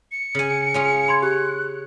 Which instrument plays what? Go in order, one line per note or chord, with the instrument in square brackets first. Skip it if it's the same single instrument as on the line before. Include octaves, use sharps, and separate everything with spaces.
[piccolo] C#7
[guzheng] C#3 G#5
C#4 F4 G#4
[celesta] B5 C6 G#6
[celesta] G4 [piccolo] F#6